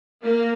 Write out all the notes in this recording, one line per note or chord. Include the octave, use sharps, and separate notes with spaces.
A#3